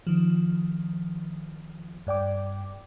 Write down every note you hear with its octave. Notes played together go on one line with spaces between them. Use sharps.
D#3 F3
G2 D5 G5 D6